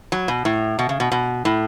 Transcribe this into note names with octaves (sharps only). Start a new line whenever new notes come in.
F#3
B2
A2
B2
C#3
B2
B2
A2